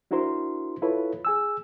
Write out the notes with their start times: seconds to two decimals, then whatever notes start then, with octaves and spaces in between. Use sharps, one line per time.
0.11 D4 E4 F#4 A#4 C5 C6
0.82 E4 F4 A4 B4 C#5
1.25 G#4 G#5 E6